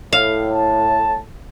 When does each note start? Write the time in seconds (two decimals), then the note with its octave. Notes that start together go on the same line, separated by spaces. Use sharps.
0.13 A2 F5
0.52 A5